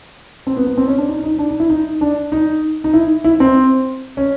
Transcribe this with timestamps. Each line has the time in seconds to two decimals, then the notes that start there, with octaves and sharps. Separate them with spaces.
0.47 C4
0.57 B3
0.67 B3
0.77 C4
0.88 C#4
0.98 D4
1.08 D#4
1.23 D#4
1.39 D4
1.49 D#4
1.60 E4
1.70 D#4
2.01 D4
2.32 D#4
2.84 D#4
2.94 E4
3.24 E4
3.40 C4
4.17 C#4